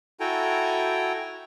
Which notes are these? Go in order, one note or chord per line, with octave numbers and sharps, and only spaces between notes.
E4 F#4 A4 G5 G#5 A#5